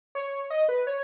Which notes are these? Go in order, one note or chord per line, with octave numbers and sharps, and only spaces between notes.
C#5
D#5
B4
C#5